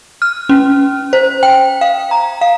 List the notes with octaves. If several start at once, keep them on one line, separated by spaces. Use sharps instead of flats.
F6
C#4
C5
G5
F5
A#5
F5